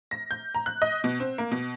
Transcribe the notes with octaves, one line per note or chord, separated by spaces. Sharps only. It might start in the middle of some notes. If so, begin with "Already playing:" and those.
A#6
G6
A#5
F#6
D#5
B2
C4
A#3
B2